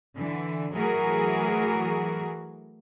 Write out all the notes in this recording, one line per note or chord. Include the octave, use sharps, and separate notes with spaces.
D3 E3
E3 F#3 A3 F#4 G#4 A#4